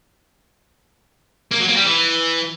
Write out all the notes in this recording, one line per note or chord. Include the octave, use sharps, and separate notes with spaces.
A#3
F#3
A#3
G3
E3